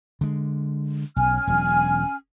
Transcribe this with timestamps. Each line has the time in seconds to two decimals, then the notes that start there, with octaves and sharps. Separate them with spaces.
0.21 D3 G#3
1.16 B1 C#4 G#5 F6
1.47 E1 F#3